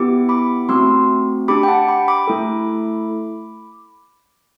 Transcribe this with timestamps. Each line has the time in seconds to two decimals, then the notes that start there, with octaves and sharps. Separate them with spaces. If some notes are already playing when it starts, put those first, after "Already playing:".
Already playing: B3 E4 G4 D6
0.29 B5 D6
0.69 A3 C4 F#4 C6 E6
1.48 D4 G4 B5 D6
1.63 G5
1.68 F#5 A5
1.88 G5 B5
2.08 B5 D6
2.27 A3 E4 A4